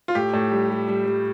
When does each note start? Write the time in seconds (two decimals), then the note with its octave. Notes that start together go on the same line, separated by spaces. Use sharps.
0.08 F4
0.15 A2 G4
0.33 A2
0.52 G3
0.70 G3
0.88 G3
1.06 G3